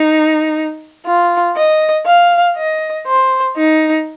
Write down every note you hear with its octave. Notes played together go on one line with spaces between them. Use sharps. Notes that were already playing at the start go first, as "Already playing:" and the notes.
Already playing: D#4
F4
D#5
F5
D#5
C5
D#4